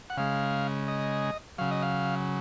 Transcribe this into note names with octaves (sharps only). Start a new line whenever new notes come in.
F#5
C#3 G#3 F5
D#5
C#3 F#3 F5
D#5
F5